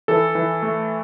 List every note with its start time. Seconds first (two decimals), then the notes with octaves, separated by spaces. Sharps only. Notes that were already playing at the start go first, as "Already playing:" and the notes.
0.08 E3 A4
0.35 E3
0.62 A3